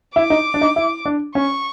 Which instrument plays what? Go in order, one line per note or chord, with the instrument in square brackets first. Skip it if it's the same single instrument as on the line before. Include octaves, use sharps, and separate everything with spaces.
[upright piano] E4 [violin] D6
[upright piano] D#4
D4
D#4
E4
D4
[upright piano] C#4 [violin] C#6